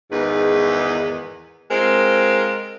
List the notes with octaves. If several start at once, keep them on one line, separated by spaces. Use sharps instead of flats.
E2 G#2 D#3 B4
G#3 C4 F4 A#4